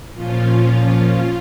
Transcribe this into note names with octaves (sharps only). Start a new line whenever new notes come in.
A#2 F3 C#4 F4